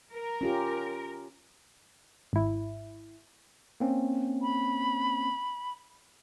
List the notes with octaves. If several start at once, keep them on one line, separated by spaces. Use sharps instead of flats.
A#4
C#4 F4 G4
G#1 E4
A#3 C4 C#4
B5